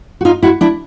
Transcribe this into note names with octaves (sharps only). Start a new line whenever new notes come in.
F#4
D#4 F4
E4 F#4
D4 E4